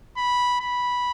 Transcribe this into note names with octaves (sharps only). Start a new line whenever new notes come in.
B5
B5